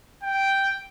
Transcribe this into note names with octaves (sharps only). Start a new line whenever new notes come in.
G5